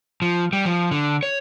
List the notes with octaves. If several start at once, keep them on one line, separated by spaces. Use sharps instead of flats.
F3
G3
F3
D3
C#5